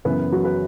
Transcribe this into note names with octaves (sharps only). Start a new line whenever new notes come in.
F#2 C#3 E3 B3 B4
F#3 F#4
B4